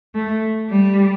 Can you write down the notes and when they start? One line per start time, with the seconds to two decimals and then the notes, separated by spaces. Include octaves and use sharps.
0.15 A3
0.70 G3